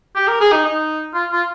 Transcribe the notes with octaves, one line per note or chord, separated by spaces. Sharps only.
G4
A#4
G#4
D#4
D#4
F4
F4